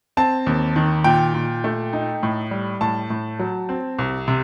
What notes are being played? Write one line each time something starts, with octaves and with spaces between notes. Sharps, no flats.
C4 A5
D#2
D#3
A#2 G5
A#2
A3
D#4
A2
G3
A2 A5
A2
F#3
C4
C2
C3